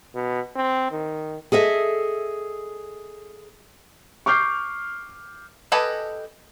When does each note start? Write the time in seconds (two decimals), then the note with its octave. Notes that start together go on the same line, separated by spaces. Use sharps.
0.15 B2
0.56 C4
0.91 D#3
1.52 G#4 A4 D#5 E5
4.26 C#6 D6 F6 G6 C7
5.72 G4 A4 B4 D#5 G#5